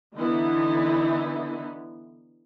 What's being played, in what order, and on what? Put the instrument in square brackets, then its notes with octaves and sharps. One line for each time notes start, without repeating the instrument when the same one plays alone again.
[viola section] D3 E3 B3 D#4 E4